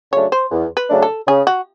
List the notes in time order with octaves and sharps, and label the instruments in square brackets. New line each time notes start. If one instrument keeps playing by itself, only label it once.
[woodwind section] C#3 F#3 A3 D4 [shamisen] C#5
[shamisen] C5
[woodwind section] E2
[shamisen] B4
[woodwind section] C#3 F#3 A3 D4
[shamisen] A4
[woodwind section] C#3 [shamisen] G#4
[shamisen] F#4